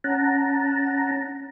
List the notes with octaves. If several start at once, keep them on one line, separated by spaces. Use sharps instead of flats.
C#4 F#5 A5 A#5